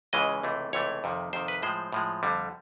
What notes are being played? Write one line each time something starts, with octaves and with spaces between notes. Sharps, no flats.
C#2 C#3 E3 G#3 D#5
C#2 C3 E3 A3
C#2 C3 E3 A3 C#5
F2 C3 D#3
F2 C3 D#3 C5
B4
A2 F3 G#3 C5
A2 F3 G#3
F2 D3 G3